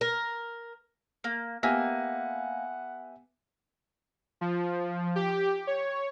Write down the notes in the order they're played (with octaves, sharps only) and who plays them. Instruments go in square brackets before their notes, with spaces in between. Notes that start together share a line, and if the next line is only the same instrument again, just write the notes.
[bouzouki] A#4
[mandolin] A#3
[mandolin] A#3 [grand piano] B3 G4 G#5 [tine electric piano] E5 [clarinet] F#5
[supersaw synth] F3
G4
C#5